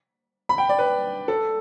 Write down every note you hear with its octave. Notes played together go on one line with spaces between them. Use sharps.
B5
G5
D5
B4
A4